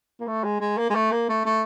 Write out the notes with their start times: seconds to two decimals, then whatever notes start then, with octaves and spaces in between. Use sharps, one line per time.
0.20 A#3
0.27 A3
0.44 G#3
0.61 G#3
0.78 A#3
0.90 G#3
0.95 A3
1.12 A#3
1.29 A3
1.45 A3